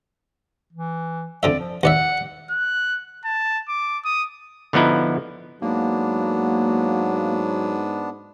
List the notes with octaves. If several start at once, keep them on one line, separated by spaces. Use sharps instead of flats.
E3
F2 D3 D5 E5
F3
D#2 D5 E5 F#5
F#6
A5
D6
D#6
D3 F3 B3 D#4 E4
G#2 F#3 A#3 B3 D4